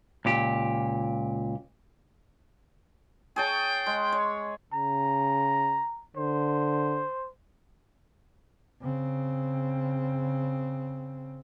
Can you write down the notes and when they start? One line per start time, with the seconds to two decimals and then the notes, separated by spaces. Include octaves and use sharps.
0.25 C#2 A#2 G4
3.36 G#4 C#5 G5 A5
3.86 G#3
4.12 C#5
4.73 C#3 A#5
6.16 D3 C5
8.81 C#3 C4